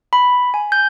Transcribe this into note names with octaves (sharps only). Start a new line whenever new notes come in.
B5
G#5
G6